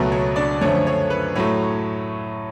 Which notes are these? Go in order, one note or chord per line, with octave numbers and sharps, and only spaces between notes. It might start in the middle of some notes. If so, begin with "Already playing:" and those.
Already playing: C#2 B2 F#3 A3 B4
C#5
D4 D5
F#2 D3 F3 A3 C#5
C#5
B4
A2 F#3 A3 C#5